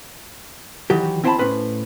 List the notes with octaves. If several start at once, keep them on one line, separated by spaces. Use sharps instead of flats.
D#3 E3 F#3 G4
C4 E4 C5 G5 A5 B5
A2 C#4 B4 C5